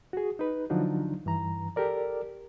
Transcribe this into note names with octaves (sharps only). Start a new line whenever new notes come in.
F#4 G#4
D#4 B4
D3 F3 F#3 D4 D#4
G2 E3 A#5
G4 A4 A#4 D5